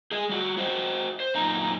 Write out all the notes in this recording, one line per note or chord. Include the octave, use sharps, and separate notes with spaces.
G#4 D#5
G3 F#4
F#4 C5 D#5
C5
F#2 A#2 D#4 A#5